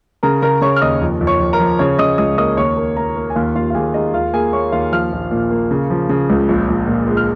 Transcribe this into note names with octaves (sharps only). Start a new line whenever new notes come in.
C#3 A#4 A#5
C#3 A#4 A#5
C#3 C#5 C#6
F6
D#2 D#5 D#6
F2
F2
C#5 C#6
F2
A#4 A#5
F3
C#3 C#5 C#6
C#3 D#5 D#6
C#2 D#5 D#6
A#3 D#5 D#6
D#2 C#5 C#6
A#3
A#3 A#4 A#5
A#3
G#5
D#2 F4 F5
D#2 F4 F5
F5
D#2 G#4 G#5
G#3 D#4 D#5
D#2 F4 F5
A#3 G#4 G#5
A#3 C#5 C#6
D#2 F4 F5
F3 F5 F6
A#1
A#2
A#3
C#3
F3
C#3
C#2
A#1
A#1
A#2
G#3
F6